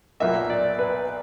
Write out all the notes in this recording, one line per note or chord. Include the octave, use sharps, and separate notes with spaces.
B1 A#2 F#3 A#3 E5
D5
B4